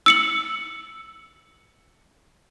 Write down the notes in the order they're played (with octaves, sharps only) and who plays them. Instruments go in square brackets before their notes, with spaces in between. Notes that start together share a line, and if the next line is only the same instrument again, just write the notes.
[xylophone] E6 C#7 F#7